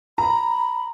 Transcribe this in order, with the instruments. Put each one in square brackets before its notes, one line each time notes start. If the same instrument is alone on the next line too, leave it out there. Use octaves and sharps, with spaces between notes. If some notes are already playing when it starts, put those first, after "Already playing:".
[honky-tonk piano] A#5 [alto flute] B5